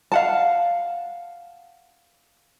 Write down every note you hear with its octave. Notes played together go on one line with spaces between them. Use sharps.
F5 F#5 A5